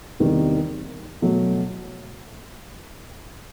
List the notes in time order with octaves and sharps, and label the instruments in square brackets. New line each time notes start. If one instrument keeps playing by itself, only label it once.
[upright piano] E2 C3 D#3 G3 A#3
B2 F#3 A3